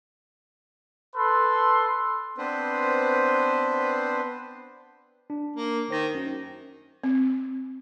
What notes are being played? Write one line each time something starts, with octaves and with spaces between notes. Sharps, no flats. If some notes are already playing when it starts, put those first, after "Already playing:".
A4 B4 C6
B3 C4 D4 B4 C5
D4
A#3
D#3 C5 A#6
F#2 C#4
C4